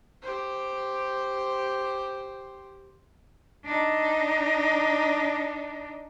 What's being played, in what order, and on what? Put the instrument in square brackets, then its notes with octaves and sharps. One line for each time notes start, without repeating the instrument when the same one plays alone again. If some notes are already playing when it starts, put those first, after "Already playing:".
[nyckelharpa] G4 C5
[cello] D4 D#4